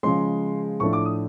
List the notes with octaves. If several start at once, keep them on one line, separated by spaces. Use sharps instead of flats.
C#3 F3 G#3 C6
A2 F3 A3 D4 C#6
D6
D#6